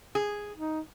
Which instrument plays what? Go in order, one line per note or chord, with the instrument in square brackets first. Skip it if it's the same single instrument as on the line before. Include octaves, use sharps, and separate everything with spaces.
[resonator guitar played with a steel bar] G#4
[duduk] D#4